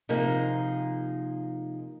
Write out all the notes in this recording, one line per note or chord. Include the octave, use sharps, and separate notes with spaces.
C3 F3 A#3 D#4 G#4